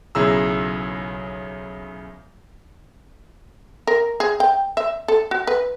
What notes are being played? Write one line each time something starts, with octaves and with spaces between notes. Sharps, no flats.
B1 C#3 E4 G#4 A#5 E6
A#4
G#4
G5
E5
A4
F#4
B4